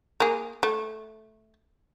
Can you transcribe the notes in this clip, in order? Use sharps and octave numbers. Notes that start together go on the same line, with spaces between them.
A#3 G#4
A3